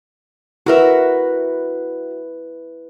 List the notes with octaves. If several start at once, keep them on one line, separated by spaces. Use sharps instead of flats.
E4 F#4 A#4 B4 E5